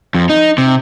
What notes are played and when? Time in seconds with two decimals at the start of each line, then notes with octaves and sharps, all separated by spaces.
0.15 F2
0.29 D#4
0.58 C3